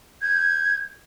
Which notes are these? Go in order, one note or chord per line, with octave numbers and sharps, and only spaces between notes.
G6 G#6